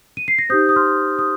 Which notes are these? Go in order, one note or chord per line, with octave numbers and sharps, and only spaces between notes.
D#7
C7
A#6
D#4 G4 C5 D#6 G6
D#6
C6 F6
D#6